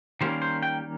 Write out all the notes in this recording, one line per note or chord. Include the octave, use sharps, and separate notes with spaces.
D#3 G3 A#3 C#4 C5
C5
G5